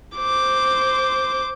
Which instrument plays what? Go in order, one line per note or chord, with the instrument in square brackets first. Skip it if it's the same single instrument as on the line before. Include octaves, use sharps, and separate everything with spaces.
[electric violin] C5 D6